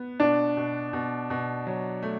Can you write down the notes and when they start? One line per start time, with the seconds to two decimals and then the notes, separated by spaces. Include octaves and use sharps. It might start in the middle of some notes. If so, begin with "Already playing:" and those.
Already playing: B3
0.20 B2 D4
0.57 B2
0.93 B2
1.30 B2
1.67 F#3
2.02 A3